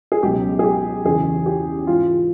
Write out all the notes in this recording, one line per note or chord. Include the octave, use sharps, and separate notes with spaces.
G#4
C#2 B2 F#3 G4
G#4
G4
E2 C#3 E3 G#4
G4
G#2 E3 F4